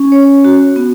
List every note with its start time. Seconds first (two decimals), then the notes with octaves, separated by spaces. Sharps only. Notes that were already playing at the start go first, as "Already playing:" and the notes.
Already playing: C#4
0.12 C#5
0.44 F#4
0.76 B3